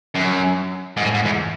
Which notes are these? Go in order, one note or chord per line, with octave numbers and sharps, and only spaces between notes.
F#2
G#2
A2
G#2
E2